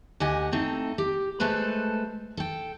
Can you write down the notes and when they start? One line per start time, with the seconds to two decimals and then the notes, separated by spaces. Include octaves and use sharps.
0.20 D2 G4 D#5 F#5 G#5
0.52 A3 C4 D#4 A4
0.98 G4
1.40 G#3 A3 A4 B4 C5
2.37 A4 G5